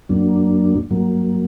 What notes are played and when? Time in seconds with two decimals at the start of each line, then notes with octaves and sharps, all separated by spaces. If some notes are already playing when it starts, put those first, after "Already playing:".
0.09 F#2 F#3 A#3 D4
0.91 G2 F#3 A#3